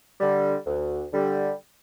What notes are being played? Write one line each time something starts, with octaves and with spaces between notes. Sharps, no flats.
D3 G3
D2
D3 G3